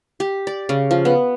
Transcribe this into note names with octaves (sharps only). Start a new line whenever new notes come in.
G4
D5
C#3
F3
B3